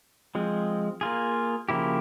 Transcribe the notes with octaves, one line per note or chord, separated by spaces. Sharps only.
F3 G#3 C4
A#3 F4 G#4
C#3 F3 A#3 E4 G4